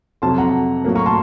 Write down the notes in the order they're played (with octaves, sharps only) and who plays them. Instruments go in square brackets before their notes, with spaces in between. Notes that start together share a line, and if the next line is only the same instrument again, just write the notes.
[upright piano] F2 C3 F#3 A5 C6
F#5 A#5
A2 F#3 A#3
A#5 C#6
A5 C6